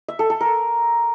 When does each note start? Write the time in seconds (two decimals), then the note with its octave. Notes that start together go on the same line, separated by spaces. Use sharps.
0.08 E5
0.19 A4
0.30 A4
0.41 A#4